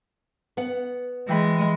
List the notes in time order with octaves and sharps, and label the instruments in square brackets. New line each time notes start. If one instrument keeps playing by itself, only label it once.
[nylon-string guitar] B3 F#5
[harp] E3 G5 B5 [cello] G#3